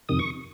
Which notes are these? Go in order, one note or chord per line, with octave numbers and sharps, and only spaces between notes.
F2 C3 D#3 D#6
C#6